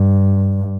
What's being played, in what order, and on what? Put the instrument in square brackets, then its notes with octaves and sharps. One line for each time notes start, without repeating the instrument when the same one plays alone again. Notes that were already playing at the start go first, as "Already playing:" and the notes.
Already playing: [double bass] G2